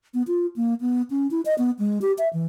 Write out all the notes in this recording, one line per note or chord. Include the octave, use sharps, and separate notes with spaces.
B3
F4
A#3
B3
C#4
E4
D#5
B3
G#3
G4
E5
E3